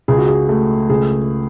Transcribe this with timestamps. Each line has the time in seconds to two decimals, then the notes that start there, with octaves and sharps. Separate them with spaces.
0.08 C#2 G#4
0.18 F#4
0.28 G#4
0.49 A3
0.90 C#2 G#4